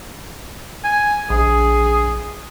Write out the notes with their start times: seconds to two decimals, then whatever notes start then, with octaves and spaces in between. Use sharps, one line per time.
0.84 G#5
1.30 A#1 G#4